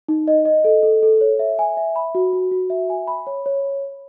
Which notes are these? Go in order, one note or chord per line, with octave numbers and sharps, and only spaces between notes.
D#4
D#5
D#5
A4
A4
A4
C#5
E5
G#5
E5
B5
F#4
F#4
F#4
E5
G#5
B5
C#5
C#5